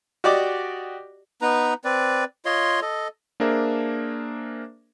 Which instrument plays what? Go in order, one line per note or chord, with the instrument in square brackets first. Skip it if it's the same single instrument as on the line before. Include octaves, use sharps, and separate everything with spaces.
[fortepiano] F#4 G4 D5 D#5 D6
[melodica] B3 D#4 B4 A#5
C4 B4 D5
F4 C#5 D#5 C6
A4 D#5
[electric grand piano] A#3 D4 G#4 A#4 C5 E5